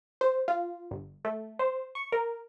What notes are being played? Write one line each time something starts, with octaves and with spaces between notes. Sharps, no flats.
C5
F4
G1
A3
C5
C#6
A#4